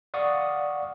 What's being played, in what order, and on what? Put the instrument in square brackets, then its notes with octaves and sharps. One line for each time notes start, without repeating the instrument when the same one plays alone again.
[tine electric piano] D5 F5 F#5 C#6 D#6